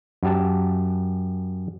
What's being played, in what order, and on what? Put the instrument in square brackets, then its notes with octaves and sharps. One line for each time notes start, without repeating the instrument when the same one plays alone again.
[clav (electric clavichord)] F#2 G4 A5